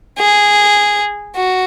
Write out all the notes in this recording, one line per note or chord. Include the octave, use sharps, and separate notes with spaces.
G#4
F#4